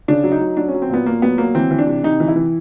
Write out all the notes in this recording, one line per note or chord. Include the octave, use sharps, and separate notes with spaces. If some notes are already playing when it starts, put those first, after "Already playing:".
C#3 D4
F#3
D#4
F#3
F#3 D4
C#4
F#3
C4
A#2 B3
A#2 A#3
F#3 B3
F#3 A#3
E3 C4
E3
D4
C3
C3 D#4
E3
E4
E3